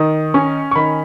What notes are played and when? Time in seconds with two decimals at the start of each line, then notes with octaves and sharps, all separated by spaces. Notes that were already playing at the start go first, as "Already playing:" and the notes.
Already playing: D#3 D#6
0.34 C#4 C#6
0.71 C#6
0.76 D#3 B5